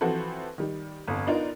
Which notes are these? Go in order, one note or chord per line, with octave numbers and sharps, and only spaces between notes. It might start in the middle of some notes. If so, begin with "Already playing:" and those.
E3 F3 C4 F#4 A4 B4
D#3 G3
G1 F2
B3 D4 D#4 F4 A#4